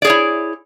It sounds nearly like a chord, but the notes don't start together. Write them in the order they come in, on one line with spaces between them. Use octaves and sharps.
D5 G#4 C#5 E4